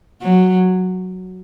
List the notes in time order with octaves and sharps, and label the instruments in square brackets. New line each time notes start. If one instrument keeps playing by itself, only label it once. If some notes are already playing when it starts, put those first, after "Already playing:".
[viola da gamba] F#3